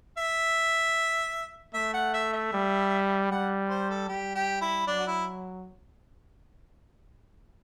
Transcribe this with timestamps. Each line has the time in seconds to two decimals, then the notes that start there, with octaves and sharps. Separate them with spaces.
0.18 E5
1.74 A3 E5
1.94 F#5
2.14 E5
2.33 E5
2.53 G3
3.31 G3 F#5
3.69 C5
3.90 A4
4.09 G3 G4
4.35 G4
4.61 E4
4.87 F#3 D4
4.99 F#4
5.07 E4